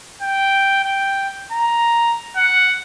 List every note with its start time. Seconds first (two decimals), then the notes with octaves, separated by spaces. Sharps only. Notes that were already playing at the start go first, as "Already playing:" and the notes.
0.22 G5
0.84 G5
1.52 A#5
2.37 F#5